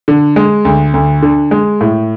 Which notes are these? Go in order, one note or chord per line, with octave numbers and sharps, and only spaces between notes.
D3
G#3
D2
D2
D3
G#3
A2